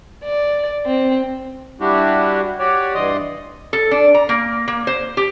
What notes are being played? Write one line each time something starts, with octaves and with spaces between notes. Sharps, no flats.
D5
C4
G3 D4 E4 F#4 G4
F#4 G4 C#5 D5
G2 E3 D5 D#5 C6 D#6
A4
D4
A#5
A#3
A#3
C5
G4